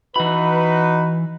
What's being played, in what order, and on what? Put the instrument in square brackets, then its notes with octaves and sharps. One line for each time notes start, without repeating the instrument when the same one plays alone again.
[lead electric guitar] E3 B5 [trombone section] D#4 F#4 B4